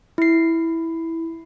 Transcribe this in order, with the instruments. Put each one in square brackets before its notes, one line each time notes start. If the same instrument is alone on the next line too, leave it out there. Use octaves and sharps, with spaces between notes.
[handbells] E4 C7